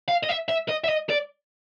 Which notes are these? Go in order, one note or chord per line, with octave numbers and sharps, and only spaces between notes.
F5
D#5
E5
E5
D#5
E5
D#5
D5